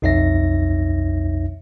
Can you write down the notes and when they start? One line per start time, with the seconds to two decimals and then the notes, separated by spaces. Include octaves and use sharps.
0.02 B1 F2 D#4 C#5 E5 A#6